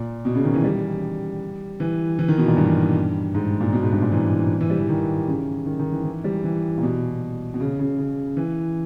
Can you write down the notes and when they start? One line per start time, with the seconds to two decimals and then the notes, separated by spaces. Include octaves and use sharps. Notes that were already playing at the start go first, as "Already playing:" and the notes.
Already playing: A#2
0.25 B2
0.35 C#3
0.44 D#3
0.54 E3
0.64 G3
1.80 E3
2.19 E3
2.28 D#3
2.38 B2
2.47 A#2
2.57 G2
3.35 G#2
3.61 A#2
3.73 B2
3.83 G#2
3.92 G2
4.02 A#2
4.12 E3
4.61 E3
4.70 G3
4.79 E3
4.89 D#3
5.28 C#3
5.66 D#3
5.79 D#3
5.92 E3
6.05 E3
6.24 G3
6.44 E3
6.77 A#2
6.83 B2
7.54 B2
7.60 C#3
7.79 C#3
7.98 C#3
8.37 E3